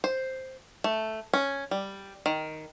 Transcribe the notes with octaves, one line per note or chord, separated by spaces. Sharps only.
C5
A3
C#4
G3
D#3